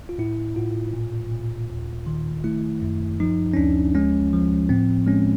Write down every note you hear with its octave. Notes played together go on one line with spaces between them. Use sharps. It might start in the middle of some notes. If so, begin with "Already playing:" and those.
F4
A2 E4
A2 F4
A#2
A#2
D#2
D#3
A3 E4
F#2
F3 D#4
C#4
D2 D4
G#3 C#4
F3
A2 C4
G#3 C#4